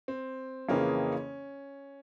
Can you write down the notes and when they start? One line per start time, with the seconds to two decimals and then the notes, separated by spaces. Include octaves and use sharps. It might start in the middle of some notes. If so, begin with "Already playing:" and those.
0.08 C4
0.69 F2 C#3 E3 A#3 C#4